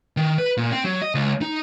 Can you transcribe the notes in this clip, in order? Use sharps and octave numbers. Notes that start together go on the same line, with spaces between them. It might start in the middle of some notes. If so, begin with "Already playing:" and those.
D#3
B4
A#2
C4
F#3
D#5
C#2
D#4